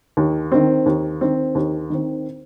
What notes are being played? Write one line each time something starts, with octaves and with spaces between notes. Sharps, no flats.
D#2
D#3 C4
D#2
D#3 C4
D#2
D#3 C4